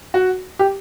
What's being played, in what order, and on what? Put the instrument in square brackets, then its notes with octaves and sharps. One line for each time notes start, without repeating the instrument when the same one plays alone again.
[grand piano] F#4
G4